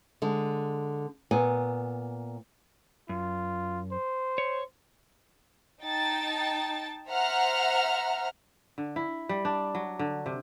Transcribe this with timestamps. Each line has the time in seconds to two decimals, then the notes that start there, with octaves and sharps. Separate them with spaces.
0.22 D3 G#3
1.31 A#2 B3 G#5
3.09 F#2 F4
3.92 C5
4.38 C#5
5.82 D#4 G5 A5 A6
7.09 C5 E5 F#5 A#5 F6
8.78 D3
8.96 E4
9.29 G3
9.45 D4
9.75 F#3
9.99 D3
10.26 C3